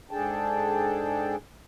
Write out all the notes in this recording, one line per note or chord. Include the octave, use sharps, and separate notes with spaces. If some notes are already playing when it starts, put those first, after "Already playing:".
G#2 D4 G#4 A4 G5 A5